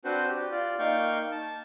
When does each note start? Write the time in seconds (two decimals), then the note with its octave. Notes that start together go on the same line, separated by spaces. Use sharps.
0.05 C4 D4 F#4 B4 C5
0.29 G4
0.51 F4 D5
0.79 A#3 D#4 F5 G5 C#6
1.32 A5